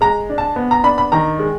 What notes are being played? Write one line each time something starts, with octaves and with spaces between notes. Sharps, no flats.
G#3 A#5
D4
A5
B3
A#5
D4 B5
B5
D#3 A#5
G#3